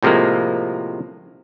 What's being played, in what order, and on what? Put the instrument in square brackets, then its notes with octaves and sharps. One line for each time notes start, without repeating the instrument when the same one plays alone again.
[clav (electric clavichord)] A2 C3 F3 G#3 A#3